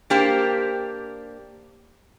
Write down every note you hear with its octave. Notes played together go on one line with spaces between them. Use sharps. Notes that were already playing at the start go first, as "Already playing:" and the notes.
A#3 D4 G4 C5